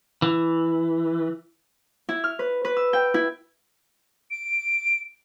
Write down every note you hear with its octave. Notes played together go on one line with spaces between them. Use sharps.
E3
E4
F6
B4
B4
E6
G5
E4
D7